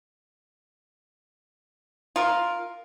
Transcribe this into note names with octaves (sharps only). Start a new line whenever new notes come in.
F4 A#4